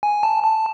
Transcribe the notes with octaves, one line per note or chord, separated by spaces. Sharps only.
G#5
A5
A5